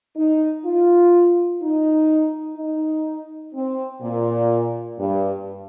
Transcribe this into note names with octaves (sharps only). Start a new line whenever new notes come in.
D#4
F4
D#4
D#4
C4
A#2
G2